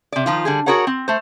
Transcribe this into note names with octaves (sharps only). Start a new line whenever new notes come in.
C3 D5
D#3 F3 F4
D3 G3 G#4
F#4 G#4 A#4 C#5 F#5
C4
A3 C5